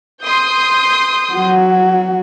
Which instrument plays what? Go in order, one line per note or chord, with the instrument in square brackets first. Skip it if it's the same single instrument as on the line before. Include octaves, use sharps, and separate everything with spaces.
[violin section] C6 D#6 G6
[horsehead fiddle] F#3 F#4